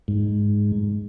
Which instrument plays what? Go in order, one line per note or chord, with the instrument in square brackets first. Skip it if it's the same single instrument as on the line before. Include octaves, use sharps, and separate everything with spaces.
[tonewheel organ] G#2